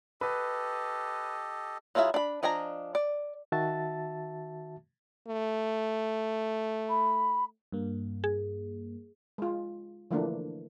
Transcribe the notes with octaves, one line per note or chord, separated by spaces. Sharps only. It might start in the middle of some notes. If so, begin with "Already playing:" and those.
G4 A4 B4 D#5
F#3 E4 F4 G#4 E5
D4 B5
F3 D4 D#5 G#5 A#5
D5
D#3 F#4 E5 A5 A6
A3
B5
G2 A#3
G#4
G#3 F4
D3 E3 F3 A3 A#3 D4